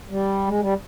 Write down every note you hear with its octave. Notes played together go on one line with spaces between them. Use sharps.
G3
G#3
G3